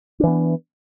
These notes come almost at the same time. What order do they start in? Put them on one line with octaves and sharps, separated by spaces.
D4 E3 B3